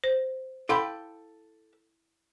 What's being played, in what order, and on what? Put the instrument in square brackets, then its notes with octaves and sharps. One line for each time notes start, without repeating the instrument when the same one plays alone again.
[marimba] C5
[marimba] E4 F5 C6 [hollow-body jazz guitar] A4 G5 B5